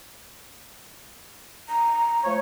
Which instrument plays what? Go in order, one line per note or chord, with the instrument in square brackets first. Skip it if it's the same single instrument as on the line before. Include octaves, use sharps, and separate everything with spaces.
[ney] A#5
[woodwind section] F3 A3 C#5